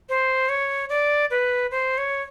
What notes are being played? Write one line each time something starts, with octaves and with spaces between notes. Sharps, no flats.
C5
C#5
D5
B4
C5
C#5